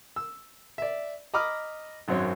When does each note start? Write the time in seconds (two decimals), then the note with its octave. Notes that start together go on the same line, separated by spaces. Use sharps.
0.16 E6
0.78 D5 E5
1.34 D#5 A#5 B5 D6 D#6 F6
2.08 G#1 F#2 F#3 C4 C#5